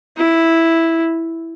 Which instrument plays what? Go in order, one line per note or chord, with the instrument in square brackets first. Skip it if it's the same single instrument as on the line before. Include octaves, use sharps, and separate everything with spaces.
[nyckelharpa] E4